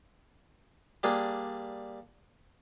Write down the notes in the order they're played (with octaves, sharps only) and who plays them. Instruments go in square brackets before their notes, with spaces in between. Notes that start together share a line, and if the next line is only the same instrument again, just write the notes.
[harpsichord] G3 A#3 D4 G#4